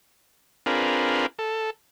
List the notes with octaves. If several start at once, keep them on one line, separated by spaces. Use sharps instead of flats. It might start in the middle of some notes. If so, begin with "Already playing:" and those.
C4 D4 F4 G#4 A#4 B4
A4